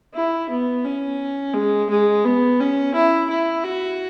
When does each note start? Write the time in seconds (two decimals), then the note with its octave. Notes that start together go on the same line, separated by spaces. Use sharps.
0.14 E4
0.50 B3
0.85 C#4
1.54 G#3
1.90 G#3
2.25 B3
2.60 C#4
2.95 E4
3.30 E4
3.64 F#4